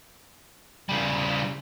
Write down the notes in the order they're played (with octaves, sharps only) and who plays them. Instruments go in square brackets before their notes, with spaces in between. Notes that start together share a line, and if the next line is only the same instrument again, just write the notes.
[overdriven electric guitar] C#3 G3